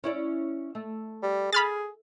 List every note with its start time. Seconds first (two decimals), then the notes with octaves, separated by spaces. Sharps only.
0.04 C#4 E4 D5
0.75 A3
1.23 G3
1.53 G#4 B5 F6 A6